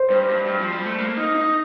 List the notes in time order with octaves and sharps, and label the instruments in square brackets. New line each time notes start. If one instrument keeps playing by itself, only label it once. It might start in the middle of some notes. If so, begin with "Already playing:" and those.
Already playing: [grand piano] C5
[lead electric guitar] G2
G2
G2
F3
G3
A3
A#3
D#4
D#4